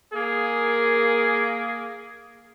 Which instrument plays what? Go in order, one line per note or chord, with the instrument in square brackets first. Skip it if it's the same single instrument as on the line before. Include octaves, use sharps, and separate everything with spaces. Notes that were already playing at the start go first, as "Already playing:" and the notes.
[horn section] A#3 G#4